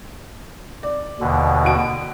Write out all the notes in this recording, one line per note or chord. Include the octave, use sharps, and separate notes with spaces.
D5
D#2 B2 D3
F#4 D7